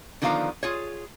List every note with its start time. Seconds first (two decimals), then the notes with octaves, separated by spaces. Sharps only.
0.22 D3 D#3 F3 B3 F5 A#5
0.63 F4 G#4 C#5